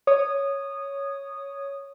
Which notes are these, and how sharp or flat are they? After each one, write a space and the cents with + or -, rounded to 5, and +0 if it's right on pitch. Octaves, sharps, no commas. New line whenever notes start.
C#5 +0 D#6 -15